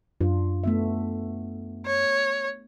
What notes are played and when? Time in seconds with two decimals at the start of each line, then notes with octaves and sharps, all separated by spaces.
0.21 F#2 D4 F4
0.64 A3 B3 E5
1.86 C#5